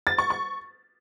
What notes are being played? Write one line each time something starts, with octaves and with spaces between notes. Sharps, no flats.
A6
C#6
C#6